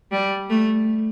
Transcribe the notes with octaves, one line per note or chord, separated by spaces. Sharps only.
G3
A3